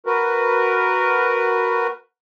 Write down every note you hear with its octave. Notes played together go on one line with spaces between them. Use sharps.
F#4 A#4 B4